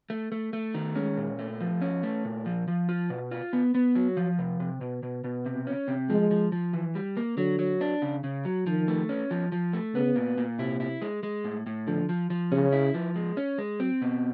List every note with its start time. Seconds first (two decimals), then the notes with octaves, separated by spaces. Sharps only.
0.10 A3
0.32 A3
0.53 A3
0.74 D#3
0.96 G#3 C#4
1.17 A#2
1.39 A3
1.60 F3
1.81 C#4
2.03 A3
2.25 A#2
2.46 F3
2.68 F3
2.89 F4
3.10 B2
3.31 F4
3.53 B3
3.75 B3
3.95 F#3
4.17 F3
4.39 C3
4.60 C3
4.81 B2
5.03 B2
5.24 B2
5.46 C3
5.67 C#4
5.88 C3
6.09 F3 G#3
6.31 F3
6.52 F3
6.73 E3
6.95 G3
7.17 A#3
7.38 D3 F#3
7.59 F#3
7.81 D4
8.02 C#3
8.24 C#3
8.45 F#3
8.66 D#3 F3
8.88 A3
9.09 C#4
9.31 F3
9.52 F3
9.73 A3
9.94 C#3 B3
10.16 A#2
10.38 A#2
10.59 C3 E4
10.80 E4
11.02 G#3
11.23 G#3
11.44 A2
11.67 A2
11.87 D3 F3
12.09 F3
12.30 F3
12.52 C#3 C#4
12.73 E4
12.94 F3
13.16 G#3
13.37 C#4
13.58 G#3
13.80 F#3 C4
14.02 B2